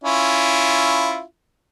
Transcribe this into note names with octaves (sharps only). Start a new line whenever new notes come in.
C#4 E4 F4